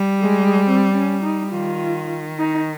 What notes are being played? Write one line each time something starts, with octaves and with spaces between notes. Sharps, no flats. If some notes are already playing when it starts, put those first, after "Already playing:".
Already playing: G3
G#3
C4
C#4
D#4
D#3 F4
D#4